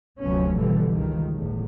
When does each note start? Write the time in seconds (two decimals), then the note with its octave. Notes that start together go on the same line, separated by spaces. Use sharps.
0.20 F1 D2 F3 F#3 B3 C#4
0.56 G2 B2 D3 E3 G3
0.88 G1 C#2 G2 D#3
1.35 G1 E2 A2